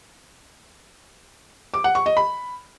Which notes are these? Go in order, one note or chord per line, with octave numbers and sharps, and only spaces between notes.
D6
F#5
C#6
D#5
B5